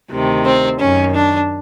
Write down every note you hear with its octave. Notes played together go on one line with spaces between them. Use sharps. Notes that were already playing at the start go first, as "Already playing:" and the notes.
D2 C3 D#3
C4
F#2 D#3 C#4
D4